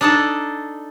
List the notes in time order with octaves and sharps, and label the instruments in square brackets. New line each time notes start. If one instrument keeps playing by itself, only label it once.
[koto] D4 D#4 A4